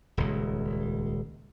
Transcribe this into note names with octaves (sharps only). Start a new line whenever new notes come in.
D#1 C#2